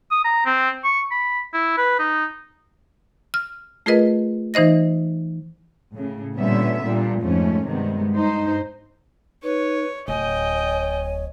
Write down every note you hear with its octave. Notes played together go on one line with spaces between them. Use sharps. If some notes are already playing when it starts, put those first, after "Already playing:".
D#6
A#5
C4
C#6
B5
E4
B4
D#4
F6
A3 F4 G#4 A#4 B4 D#5
E3 D#4 C5 D#5 A#6
A2 C#3
A#2 D3 G3 B3 C#4 E5
A#2 G3 D4
F2 G#2 A3 C#4
G2 C3 D#3 G#3 B3
G2 D#4 C5
D#4 B4 C#5
D1 C#5 D#5 G5 G#5